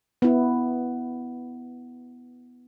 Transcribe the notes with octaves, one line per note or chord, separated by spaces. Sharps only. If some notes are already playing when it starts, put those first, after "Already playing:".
B3 E4